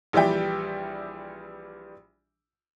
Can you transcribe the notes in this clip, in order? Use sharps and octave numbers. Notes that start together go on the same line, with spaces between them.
A#1 E3 G3 D5 E5 G5